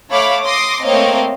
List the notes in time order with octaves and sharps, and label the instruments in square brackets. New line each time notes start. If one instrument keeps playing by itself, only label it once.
[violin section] A3 C#5 F5 B5 D6
C6 D6 D#6 A#6 C7
A3 A#3 C4 C#5 D#5 F5